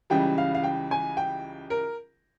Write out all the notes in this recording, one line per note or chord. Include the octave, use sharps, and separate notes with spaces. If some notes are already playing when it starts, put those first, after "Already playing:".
C#2 C#3 E3 G3 G5
F5
F5
G5
G#5
G5
A#4